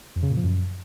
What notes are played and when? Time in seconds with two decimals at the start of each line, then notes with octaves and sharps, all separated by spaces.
0.16 F2
0.23 C#3
0.30 A#2
0.37 F3
0.44 F#2